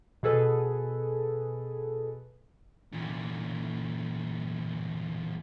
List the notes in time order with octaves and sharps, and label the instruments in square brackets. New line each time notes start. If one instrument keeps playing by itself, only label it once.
[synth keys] B2 G#4 A4 B4
[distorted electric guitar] E2 A#2